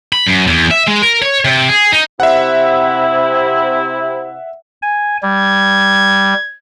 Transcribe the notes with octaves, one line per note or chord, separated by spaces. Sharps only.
B5
F#2
E2
E5
G#3
A#4
C#5
C3
G#4
D#4
C3 E4 E5 F#5
G#5
G3 G#6